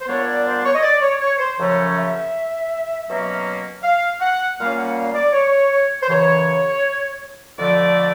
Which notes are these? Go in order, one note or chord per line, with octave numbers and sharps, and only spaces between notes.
C5
A#2 G3 B3 D4 C#5
D5
C5
C#5
D#5
D5
C#5
C#5
C5
F#2 C#3 F3 A3 C#4 C#5
E5
B2 F#3 A#3 C#4
F5
F#5
A#2 G3 A#3 C#4 F5
F#5
F5
D5
C#5
C5
F#2 C#3 E3 C#5
F2 D3 F3 A3 D5